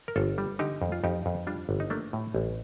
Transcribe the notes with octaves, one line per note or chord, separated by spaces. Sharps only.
A#4
G1 F4 A4
G3
D3 D#4 G4
F2
F4
F2 D#4 G4
F2
G3 D4 F4
G1
D#4
A3 A#3 D4
A2
A1